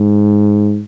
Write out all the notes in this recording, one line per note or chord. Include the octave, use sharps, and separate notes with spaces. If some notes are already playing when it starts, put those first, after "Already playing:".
Already playing: G#2